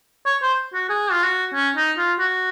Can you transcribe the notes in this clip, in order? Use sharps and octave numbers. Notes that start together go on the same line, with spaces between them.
C#5
C5
F#4
G#4
F4
F#4
C#4
D#4
F4
F#4